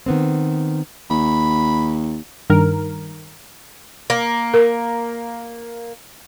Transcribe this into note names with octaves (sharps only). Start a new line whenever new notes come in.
D#3 B3 C4
D#2 B5
G2 D#3 A#4
A#3
A#4